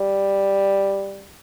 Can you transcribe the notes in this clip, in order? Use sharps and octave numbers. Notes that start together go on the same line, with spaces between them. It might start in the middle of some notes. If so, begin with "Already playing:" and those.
Already playing: G3